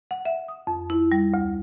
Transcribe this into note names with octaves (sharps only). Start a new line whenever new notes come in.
F#5
E5
D#6
F2
E4
G3
D2